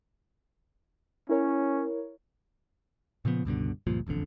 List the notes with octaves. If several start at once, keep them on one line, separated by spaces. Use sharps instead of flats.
C#4 E4 A#4 C#5
A#2 C#3 F3 B3
C#2 G2 B2 D3
C#2 G2 A#2 F3
E1 A1 F2 D3